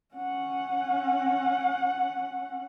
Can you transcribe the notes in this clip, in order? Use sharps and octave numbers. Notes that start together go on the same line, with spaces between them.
C#4 F#5